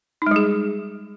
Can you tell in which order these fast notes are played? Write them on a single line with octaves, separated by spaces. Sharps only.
D#4 G#3 G3 G#4